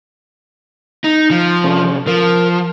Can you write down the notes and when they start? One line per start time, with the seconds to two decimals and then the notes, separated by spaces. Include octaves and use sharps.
1.04 D#4
1.31 F3
1.64 C3 C#4 A4
2.07 F3 A#4